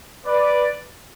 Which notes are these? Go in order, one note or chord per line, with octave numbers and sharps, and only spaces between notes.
B4 D5